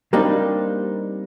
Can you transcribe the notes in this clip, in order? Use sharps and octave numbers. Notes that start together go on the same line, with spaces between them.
G3 A#3 C4 D4 D#4 G4